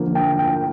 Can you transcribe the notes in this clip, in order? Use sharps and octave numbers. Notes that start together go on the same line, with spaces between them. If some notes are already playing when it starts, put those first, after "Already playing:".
Already playing: D3 F3 A#3
G5
G5